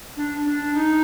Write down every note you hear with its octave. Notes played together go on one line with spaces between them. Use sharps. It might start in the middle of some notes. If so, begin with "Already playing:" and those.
D4
D4
D#4